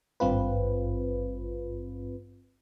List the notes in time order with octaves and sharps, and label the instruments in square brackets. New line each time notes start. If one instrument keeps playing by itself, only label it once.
[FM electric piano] G#1 G2 C4 F4 B4